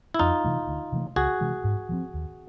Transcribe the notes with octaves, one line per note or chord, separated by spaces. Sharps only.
E4
F2 D#4 F4
C3 E3 A3
D2
C3 E3 A3
C#2 F#4 G#4
C3 E3 G#3
G#2
F3 A3 C4
D#2